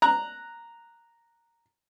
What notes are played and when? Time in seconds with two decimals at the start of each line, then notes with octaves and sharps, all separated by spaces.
0.02 A#5 F#6